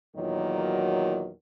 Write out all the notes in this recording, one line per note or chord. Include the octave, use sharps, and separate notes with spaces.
E2 A#2 D#3 F#3